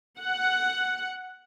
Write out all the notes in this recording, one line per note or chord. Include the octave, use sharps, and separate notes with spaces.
F#5